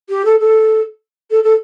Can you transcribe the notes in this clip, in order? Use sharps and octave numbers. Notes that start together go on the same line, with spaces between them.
G4
A4
A4
A4
A4